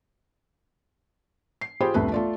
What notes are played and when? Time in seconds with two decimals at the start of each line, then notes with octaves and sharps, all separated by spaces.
1.61 C7
1.81 F4 G4 G#4 C5 G5 B5
1.94 E1 C2 F3 A3 B4
2.12 A3 F4 D5